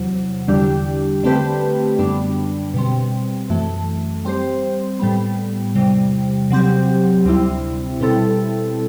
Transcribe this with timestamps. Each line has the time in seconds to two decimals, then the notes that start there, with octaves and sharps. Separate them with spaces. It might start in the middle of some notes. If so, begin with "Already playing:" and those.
Already playing: E2 C3 F#3
0.48 E2 D3 G3 D4 G4
1.24 D3 A3 C4 G4 B4
1.99 F#2 D3 G3 B3 D4
2.74 B2 G3 C4
3.50 F#2 E3 A3
4.25 G3 C4 G4 C5
4.99 A2 G3 B3
5.75 E2 C3 G3
6.50 C3 F#3 C4 G4
7.25 D2 C3 G3 C4 E4
8.01 B2 G3 C4 E4 A4